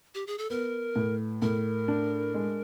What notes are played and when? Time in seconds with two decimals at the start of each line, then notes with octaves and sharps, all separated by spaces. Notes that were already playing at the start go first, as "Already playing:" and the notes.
0.15 G4
0.27 G#4
0.38 A4
0.50 B3 A#4
0.96 A2
1.42 A2 A#4
1.88 D4
2.34 G#3